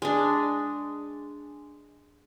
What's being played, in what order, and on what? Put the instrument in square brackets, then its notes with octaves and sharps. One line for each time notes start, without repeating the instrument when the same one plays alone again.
[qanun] G#3 D4